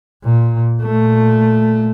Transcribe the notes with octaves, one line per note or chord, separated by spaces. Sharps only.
A#2
A#2 A3